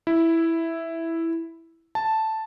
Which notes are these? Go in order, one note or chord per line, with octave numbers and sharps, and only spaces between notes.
E4
A5